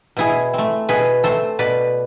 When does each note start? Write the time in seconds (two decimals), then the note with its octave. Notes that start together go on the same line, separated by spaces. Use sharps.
0.17 B2 E4 G#4
0.53 A3 C4
0.89 B2 G#4 B4
1.24 A3 C4 A4 C5
1.59 B2 B4 D5